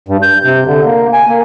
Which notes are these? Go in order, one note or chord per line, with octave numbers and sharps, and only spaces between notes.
G2
G6
C3
D3
A#3
G#5
A#3